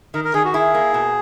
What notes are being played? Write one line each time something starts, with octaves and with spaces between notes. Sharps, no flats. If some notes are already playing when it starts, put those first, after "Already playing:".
D#3 A#4
A#4
D#3 G#4
F#4
E4 G#4
A#3
B2